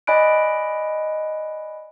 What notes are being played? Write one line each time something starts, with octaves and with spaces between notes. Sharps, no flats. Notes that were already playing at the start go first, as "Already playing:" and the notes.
D5 D#5 G#5 B5 F#6 D7